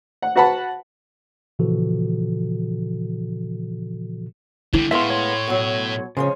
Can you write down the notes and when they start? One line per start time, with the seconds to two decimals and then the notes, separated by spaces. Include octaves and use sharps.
0.22 F#5
0.36 F#4 B4 F#5 A5 B5
1.59 A#2 C#3 E3 F3 F#4 A4
4.73 D3 G3 E4
4.91 A2 G#3 B3 E5 F5 C6
5.10 C#5 C6
5.48 B2 F#3
6.17 C#3 F3 G#3 C#4